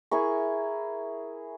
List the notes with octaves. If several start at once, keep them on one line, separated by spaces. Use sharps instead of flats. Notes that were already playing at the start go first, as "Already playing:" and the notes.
E4 G#4 A#4 C#6